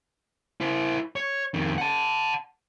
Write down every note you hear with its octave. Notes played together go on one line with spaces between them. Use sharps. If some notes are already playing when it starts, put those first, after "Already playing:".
E4 C5
C#5
F2 D#3
F#5 A5